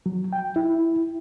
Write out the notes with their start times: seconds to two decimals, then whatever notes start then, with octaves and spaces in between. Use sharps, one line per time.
0.06 F#3
0.33 G5
0.56 E4